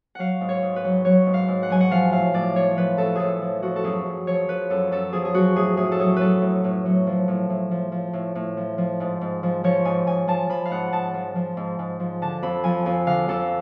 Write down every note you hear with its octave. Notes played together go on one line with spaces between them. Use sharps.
F#3 F5 F#5
G#2
C#5
G#2
B4
F#3
F#3 C#5
G#2
F5
G#2
F#5
F#3 G#5
F#5
F3 F5
A2 F5
A2 D5
F3 C#5
F3 B4
A2 A4
A2 G#4 A4
F3
F3 F#4
A4
F#2 G#4
F#2
F3 C#5
F3 B4
F#2 A4
F#2 A4
F3 G#4
G#4
F#3 F#4
A2 G#4
A2 G#4
A4
F#3 G#4
F#3 A4 B4
A2
A2
F#3
F3
A2
A2
F3
F3
A2
A2
F3
F3
G#2
G#2
F3
F3 C#5
G#2 G#5
G#2 G#5
F3 A5
F3 B5
F5
G#2 F#5
G#2 A5
F3
F3
G#2
G#2
F3
D3 A5
F2 B5
F3 G#5
F2 G#5
D3 F5
F2 A4